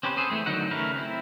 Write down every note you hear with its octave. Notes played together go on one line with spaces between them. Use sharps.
C4 C#4 G4 B4 C5
B3 C4 G#4 A4 C5
E3 A3 C4
D3 D#3 F#3 D#4 F#5
C#3 A3 C#4 A#4 B4
C4 E4